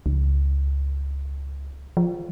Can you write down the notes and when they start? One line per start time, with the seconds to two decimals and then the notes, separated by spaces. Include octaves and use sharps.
0.06 C#2
1.97 F3